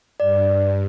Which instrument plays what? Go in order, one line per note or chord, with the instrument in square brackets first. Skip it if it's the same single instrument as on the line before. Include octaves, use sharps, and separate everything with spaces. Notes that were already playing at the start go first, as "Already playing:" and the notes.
[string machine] G2 [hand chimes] D5